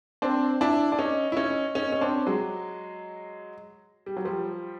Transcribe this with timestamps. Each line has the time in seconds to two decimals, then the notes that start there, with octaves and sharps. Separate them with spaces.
0.22 C4 D4
0.61 D4 E4
0.92 D4
0.98 C#4 D#4
1.32 E4
1.37 C#4 D#4
1.75 C#4 D#4
1.92 C#4
2.01 C4 D4
2.26 F#3 G#3
4.06 G3
4.16 F#3
4.25 F3 G3